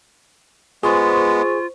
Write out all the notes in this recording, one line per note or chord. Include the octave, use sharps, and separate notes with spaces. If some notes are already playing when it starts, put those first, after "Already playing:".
G#3 B3 F4 G#4 C5 C#6